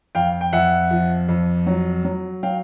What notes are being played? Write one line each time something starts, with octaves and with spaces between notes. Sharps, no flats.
F2 F5 G5
G5
F2 E5 F#5
F3
F2
F#3
F#3
F#3 F5 G5